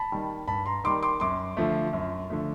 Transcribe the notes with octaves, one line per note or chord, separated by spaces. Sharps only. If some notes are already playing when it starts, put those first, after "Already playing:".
Already playing: A5 B5
D#3 G3 A#3
G2 A5 B5
A#5 C6
D#3 G3 A#3 C6 D6
C6 D6
F#2 C6 D6
D3 F3 A3
F#2
D3 F3 A3